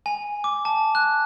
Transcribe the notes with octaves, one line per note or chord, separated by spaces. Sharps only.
G#5
D6
A5
F#6